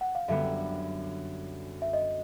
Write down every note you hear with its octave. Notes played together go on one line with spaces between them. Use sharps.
F#5
F5
F#2 D3 G3 B3 E5
E5
D#5